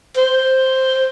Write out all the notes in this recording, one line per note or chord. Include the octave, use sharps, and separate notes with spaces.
C5